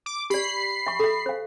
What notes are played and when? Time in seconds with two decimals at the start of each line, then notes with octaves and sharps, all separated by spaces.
0.06 D6
0.30 G4 D5 B5 C7
0.87 E5 C#6
1.00 A4 E5
1.26 C5 F5